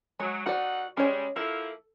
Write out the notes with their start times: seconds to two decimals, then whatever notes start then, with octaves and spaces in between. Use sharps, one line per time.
0.20 F#3 G#3
0.46 D#2 D#4 F#4 D5 F#5
0.97 G3 G#3 C#4 C#5
1.36 F3 A#3 E4 A4